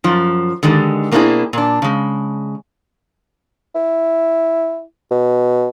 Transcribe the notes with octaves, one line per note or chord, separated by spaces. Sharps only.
F#2 F3
D3 D#3 G#3 G4
B2 A#3 C4 D4 E4 G#4
A#2 D4
C#3 G#3
E4
B2